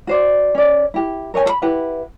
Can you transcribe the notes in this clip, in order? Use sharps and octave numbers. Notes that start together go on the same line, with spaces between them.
F#4 C5 D5
C#4 D5
E4 G4
A#4 C#5 D#5 G#5
A4 B5
E4 G4 B4 F#5